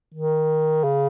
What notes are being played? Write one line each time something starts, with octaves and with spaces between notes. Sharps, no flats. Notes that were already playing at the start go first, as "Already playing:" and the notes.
D#3
C#3